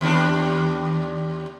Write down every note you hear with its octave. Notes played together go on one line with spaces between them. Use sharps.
D#2 G3 D4